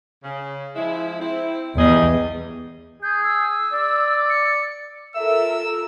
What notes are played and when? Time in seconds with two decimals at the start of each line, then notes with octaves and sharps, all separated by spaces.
0.24 C#3
0.75 F3 G#3 E4
1.20 C4 E4
1.78 E2 G3 G#4 D#5
3.03 G#4 G6
3.24 E6
3.73 D5
4.30 C#7
5.16 F4 A4 A#4 E5 E6